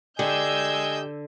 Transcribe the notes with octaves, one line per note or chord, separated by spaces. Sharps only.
D3 G4 D#5 G#5 E6 G6